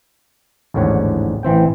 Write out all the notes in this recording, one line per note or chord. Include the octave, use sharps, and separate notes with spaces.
A1 D#2 G#2 D3 C#5 F#5
A1 E3 C4 G5